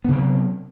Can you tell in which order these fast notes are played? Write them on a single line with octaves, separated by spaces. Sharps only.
B3 C3 C4 F#3